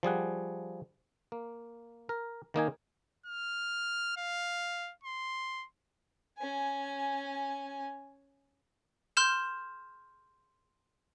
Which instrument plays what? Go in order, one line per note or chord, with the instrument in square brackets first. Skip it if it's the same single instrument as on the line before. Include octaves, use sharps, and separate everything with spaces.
[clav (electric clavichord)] F3 G3 G#4 F#5
A#3
A#4
D#3 A#3 D#4 G#5
[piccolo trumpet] F6
F5
C6
[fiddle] C#4 G#5
[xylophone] C6 F6 G6 E7